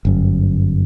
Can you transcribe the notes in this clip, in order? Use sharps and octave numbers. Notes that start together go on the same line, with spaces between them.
G1 F#2